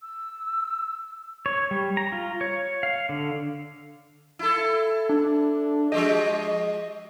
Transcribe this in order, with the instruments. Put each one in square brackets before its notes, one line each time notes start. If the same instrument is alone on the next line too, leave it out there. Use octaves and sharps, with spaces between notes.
[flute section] E6
[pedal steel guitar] C#5
G3
A#5
F4
C#5
F5
D3
[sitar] E4 A4
[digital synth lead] D4
[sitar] F3 G#3 G4 [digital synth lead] D#5